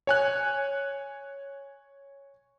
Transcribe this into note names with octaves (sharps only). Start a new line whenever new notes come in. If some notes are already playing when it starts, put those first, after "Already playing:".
C#5 G#5 F#6